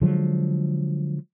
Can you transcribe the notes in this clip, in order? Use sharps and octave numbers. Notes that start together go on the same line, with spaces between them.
D3 F3 F#3 G#3